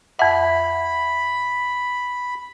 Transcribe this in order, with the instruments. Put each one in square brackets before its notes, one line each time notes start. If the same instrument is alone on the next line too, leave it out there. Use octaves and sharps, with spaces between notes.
[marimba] F2 F#5 [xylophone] E5 [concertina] B5